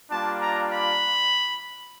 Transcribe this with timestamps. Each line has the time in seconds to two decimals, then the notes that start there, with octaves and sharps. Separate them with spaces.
0.11 G3 A#3 D4 F4 A5
0.41 A#5
0.72 B5